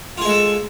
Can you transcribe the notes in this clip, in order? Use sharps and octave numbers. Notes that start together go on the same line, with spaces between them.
G#3 F4 G#4 A4